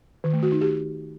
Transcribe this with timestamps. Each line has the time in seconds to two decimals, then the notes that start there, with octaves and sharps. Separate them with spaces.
0.24 D#3
0.33 A3
0.43 F#4
0.52 D#4
0.61 G4